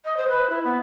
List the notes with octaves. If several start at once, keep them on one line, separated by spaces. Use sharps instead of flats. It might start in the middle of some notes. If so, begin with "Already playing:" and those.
D#5
C5
B4
E4
B3